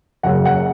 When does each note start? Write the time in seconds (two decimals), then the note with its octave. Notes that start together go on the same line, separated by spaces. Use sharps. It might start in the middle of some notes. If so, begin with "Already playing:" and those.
0.23 F#1 F#2 C#3 F#5
0.45 F#5